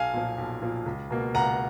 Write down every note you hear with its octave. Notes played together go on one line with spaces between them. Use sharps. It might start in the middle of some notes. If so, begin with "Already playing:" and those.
Already playing: B1 F5 G#5
A#2 F3
B1
A#2 F3
C#2
B2 A#3
C#2 F#5 A#5